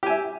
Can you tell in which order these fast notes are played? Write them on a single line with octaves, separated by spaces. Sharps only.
G4 G#5 E5